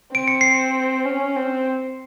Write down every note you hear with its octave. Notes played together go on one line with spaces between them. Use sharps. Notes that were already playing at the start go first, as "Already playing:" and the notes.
C4 D7
C#7
C7
C#7
C#4
C4